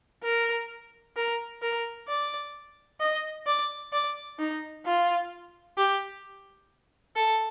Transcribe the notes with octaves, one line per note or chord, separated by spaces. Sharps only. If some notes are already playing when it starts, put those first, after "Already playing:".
A#4
A#4
A#4
D5
D#5
D5
D5
D#4
F4
G4
A4